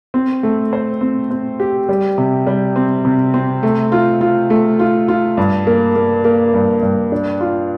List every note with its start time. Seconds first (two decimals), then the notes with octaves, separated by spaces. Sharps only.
0.14 C4
0.43 A3
0.73 C5
1.01 C4
1.30 C4
1.60 G4
1.89 G3
2.18 C3
2.47 G3
2.76 C4
3.05 C3
3.34 C4
3.63 A3
3.92 F4
4.21 F4
4.50 A3
4.79 F4
5.08 F4
5.37 G2
5.67 A#3
5.96 A#3
6.25 A#3
6.54 G2
6.83 G2
7.12 D4
7.40 F4